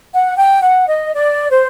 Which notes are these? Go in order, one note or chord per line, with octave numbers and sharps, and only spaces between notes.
F#5
G5
F#5
D#5
D5
C5